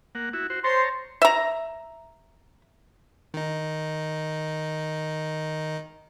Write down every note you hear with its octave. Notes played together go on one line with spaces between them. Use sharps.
A#3 F#5
E4 F#4
F#4 C5
C5 C#5 A5 A#5 C6
E5 A#5
D#3 D#4